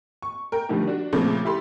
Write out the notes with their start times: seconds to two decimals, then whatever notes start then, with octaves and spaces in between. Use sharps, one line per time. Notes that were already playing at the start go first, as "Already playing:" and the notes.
0.22 C#6
0.52 A#4 G5
0.69 A2 D3 D#3 F3 G3
0.87 D4 F#4
1.13 A#2 C#3 F3 A3 C4
1.45 E4 G4 A4 B5 C6